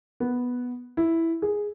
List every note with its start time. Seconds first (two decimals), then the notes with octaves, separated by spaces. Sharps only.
0.20 B3
0.97 E4
1.42 G#4